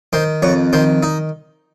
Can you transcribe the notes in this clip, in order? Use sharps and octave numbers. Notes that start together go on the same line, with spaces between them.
D#3 C5
F2 C#5
D#3 C5
D#4